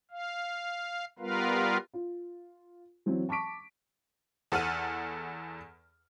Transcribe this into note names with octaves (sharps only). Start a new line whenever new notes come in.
F5
G3 B3 F4 A#4 B4 F5
F4
E3 F#3 C4
A5 C#6 D6 B6 D7
E2 A4 F#5 F6 D#7